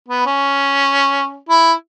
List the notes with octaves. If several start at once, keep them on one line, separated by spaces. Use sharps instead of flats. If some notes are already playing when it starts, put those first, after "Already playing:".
B3
C#4
E4